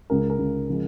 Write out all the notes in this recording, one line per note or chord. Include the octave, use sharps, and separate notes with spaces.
C#2 C#3 G#3 A#4
A#4
C#2 C#3 G#3
C#3 F3 G#3